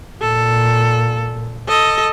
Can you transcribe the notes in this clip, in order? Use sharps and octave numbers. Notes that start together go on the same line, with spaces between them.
A#2 A4
A4 D#5